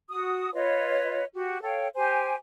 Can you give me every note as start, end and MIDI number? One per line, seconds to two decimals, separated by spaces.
0.09 0.53 66
0.09 0.53 87
0.54 1.24 65
0.54 1.24 71
0.54 1.24 73
0.54 1.24 75
1.33 1.61 66
1.33 1.61 67
1.62 1.87 69
1.62 1.87 73
1.62 1.87 77
1.62 1.87 79
1.95 2.35 67
1.95 2.35 72
1.95 2.35 80